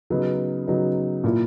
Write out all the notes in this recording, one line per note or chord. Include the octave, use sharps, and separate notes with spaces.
C#3 F#3 B3 D#4
C#3 F#3 B3 D#4
A#2 A#3 E4